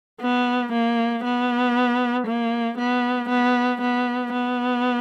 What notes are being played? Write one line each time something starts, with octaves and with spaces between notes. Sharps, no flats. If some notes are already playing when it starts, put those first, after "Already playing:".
B3
A#3
B3
A#3
B3
B3
B3
B3